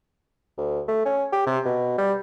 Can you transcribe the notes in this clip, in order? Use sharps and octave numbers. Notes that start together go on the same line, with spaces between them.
D2
A3
C#4
G4
C3
B2
G3